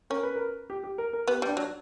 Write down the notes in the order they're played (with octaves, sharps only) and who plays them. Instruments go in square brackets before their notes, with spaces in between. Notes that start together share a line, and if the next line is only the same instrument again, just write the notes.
[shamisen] C#4 [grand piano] A#4
[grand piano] B4
A#4
G4
G4
A#4
A#4
[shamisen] B3 [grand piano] G4
[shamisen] G3 [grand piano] D4
[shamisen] F#3 [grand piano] D4